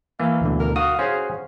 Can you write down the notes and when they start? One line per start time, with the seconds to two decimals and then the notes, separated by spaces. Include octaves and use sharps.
0.20 E3 A#3 A#4 F5
0.41 D2 B2 D3
0.60 A#4
0.76 F#4 F5 D#6
0.99 C#4 F#4 G#4 C5